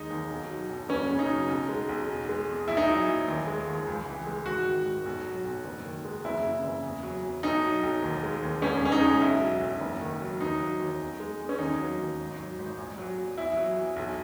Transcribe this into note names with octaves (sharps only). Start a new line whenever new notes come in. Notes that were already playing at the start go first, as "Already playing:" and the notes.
Already playing: D#2 G#3 D#4
D#2
B1
F#3
B1
F#1 C#4
C#3
D#4
F#3
B1
G#3
B1
E2
G#3
E2
A#1 E4
D#4
F#3 E4
A#1
D#2
G#3
D#2
C#2
E3
G#3
G#1 F#4
D#3
G#1
B1
F#3
B1
F#1
D#3
G#3
F#1 E4
C#3
F#1
E2
F#3
E2
B1 D#4
F#3
B1
D#2
G#3
D#2
E1 C#4
C#3 C#4
D#4
G#3
B1 E4
F#3
B1
F#1
D#3
F#3
D#2 D#4
F#3
D#2
E2
G#3
E2
C#4
D#2 D#4
F#3
D#2
G#1
F#3
G#1
A#1
F#3
A#1
E2 E4
F#3
E2
B1